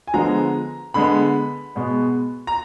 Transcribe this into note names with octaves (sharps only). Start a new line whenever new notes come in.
G#5
D3 F3 G#3 B3 A#5
D3 G#3 B3 B5
B2 G#3 B3
A#5